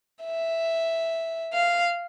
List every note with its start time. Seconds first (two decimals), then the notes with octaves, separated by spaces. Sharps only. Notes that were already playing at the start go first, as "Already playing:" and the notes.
0.24 E5
1.54 F5